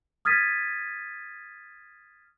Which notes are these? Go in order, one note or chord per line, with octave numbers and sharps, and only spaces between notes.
D#6 F6 G#6 A6 B6 D#7